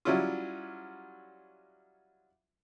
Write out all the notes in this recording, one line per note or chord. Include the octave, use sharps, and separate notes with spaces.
F#3 G3 C#4 E4 F4